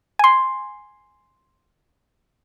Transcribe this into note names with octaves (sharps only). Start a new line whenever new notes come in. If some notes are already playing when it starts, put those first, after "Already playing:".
G#5 C6